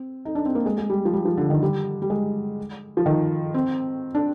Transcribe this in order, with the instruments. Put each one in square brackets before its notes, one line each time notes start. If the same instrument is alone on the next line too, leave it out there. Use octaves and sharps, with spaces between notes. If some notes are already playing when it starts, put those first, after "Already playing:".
Already playing: [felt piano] C4
D#4
D4
C4
A#3
G#3
G#3
G3
F3
G3
F3
D3
D#3
G3
G3
G#3
F3
D#3
C4
D4